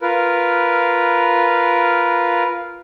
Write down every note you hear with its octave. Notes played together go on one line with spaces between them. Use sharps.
F4 A#4 B4